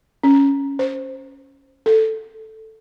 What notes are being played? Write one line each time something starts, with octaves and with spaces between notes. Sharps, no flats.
C#4
C5
A4